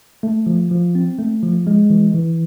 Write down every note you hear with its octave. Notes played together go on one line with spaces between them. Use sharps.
A3
F3
F3
C4
A3
F3
G#3
E3
E3